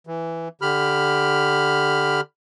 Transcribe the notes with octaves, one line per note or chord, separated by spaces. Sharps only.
E3
D3 G4 B5 F6